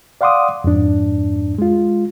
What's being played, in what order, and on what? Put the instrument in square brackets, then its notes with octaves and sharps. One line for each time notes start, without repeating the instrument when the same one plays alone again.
[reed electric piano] D5 F5 F#5 C6 D6 D#6
F2 G#2 D4
G#3 F4